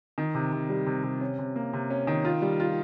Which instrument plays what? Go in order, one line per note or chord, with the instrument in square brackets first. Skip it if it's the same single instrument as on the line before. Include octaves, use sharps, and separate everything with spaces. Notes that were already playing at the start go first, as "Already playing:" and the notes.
[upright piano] D#3
C3
C3
G3
C3
C3
C#4
C3
A#3
C3
C#4
D#3
F4
G3
F4